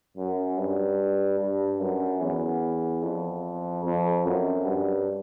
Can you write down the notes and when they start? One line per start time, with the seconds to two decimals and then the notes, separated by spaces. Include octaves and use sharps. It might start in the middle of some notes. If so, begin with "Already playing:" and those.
0.17 F#2
0.58 G2
1.40 G2
1.80 F#2
2.21 E2
3.03 F2
3.84 F2
4.26 F#2
4.66 G2